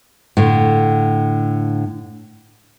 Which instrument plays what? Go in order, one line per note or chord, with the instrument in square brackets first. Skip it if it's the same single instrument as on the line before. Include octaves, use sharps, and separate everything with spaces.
[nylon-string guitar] A2 D3